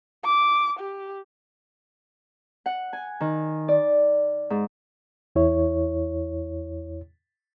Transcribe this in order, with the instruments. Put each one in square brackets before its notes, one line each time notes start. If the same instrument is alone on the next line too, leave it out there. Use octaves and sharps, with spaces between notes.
[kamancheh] D6
G4
[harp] F#5
G#5
D#3
D5
G#2
[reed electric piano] E2 E4 C#5